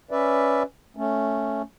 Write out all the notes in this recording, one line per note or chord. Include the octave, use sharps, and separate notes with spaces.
C#4 B4 D5 E5
A3 C#4